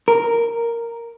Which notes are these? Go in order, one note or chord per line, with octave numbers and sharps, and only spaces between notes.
A#4